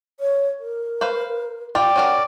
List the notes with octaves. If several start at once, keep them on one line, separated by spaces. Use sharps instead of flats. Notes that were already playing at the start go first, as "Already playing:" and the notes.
C#5
A#4
B4 C5 F5
F4 D5 G5
C#4 F#4 A#4 F#5